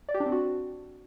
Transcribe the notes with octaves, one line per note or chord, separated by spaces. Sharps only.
D5
G4
D4
C4
F#4